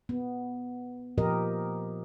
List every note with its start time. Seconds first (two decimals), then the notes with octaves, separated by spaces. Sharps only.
0.09 B3
1.18 A#2 F3 G4 A#4 D#5